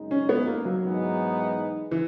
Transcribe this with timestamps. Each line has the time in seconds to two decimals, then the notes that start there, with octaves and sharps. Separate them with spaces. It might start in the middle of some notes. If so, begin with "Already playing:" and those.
Already playing: F#2 C#3 G#3 D#4
0.11 C#4
0.29 B3
0.47 A#3
0.65 F#3
0.83 G#2 E3 B3 D#4 G#4
1.91 E3